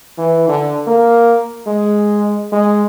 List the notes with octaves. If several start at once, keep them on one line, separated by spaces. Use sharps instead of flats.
E3
D3
A#3
G#3
G#3